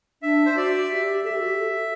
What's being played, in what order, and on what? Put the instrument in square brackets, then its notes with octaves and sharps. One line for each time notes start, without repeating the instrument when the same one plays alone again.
[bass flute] D4 [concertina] E5
[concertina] C5
[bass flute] F#4 [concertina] D5
[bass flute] G4 [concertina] E5
[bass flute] A4 [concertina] E5
[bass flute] G4
F#4
G4
A4